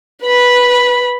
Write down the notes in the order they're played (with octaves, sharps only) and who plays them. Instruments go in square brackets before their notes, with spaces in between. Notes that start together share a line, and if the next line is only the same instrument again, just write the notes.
[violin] B4 B5